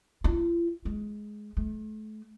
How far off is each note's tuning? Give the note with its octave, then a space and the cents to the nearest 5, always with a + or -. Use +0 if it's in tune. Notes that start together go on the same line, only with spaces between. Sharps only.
F4 -45
G#3 +15
A3 -35